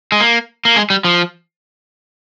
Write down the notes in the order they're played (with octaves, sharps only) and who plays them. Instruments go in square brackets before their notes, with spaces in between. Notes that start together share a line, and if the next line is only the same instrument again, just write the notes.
[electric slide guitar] G#3
A#3
A#3
G#3
G3
F3